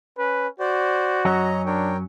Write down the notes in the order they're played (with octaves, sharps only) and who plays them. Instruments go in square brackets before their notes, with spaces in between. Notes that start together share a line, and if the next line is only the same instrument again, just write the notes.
[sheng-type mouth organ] C#4 [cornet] B4
[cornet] F#4 [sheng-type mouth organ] C5 D5
[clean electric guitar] F#2 F#3 C#4 [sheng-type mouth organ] C#5 D#5 A#5
[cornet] D4 [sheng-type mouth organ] A#4 C#5 G5